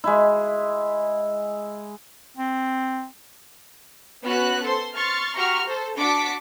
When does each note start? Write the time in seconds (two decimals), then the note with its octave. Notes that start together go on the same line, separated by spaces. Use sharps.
0.04 G#3 E4
2.37 C4
4.24 B3 C#4 F#4 B4 F#6
4.63 A4 C5 C6
4.95 C6 C#6 F6 A6
5.36 F#4 G4 A#5 C6 C#6 F6
5.66 A4 C5
5.98 D4 F#4 D6 B6 C#7 D7